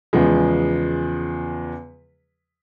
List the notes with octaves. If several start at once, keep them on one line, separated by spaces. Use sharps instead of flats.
E2 C#3 F3 G#3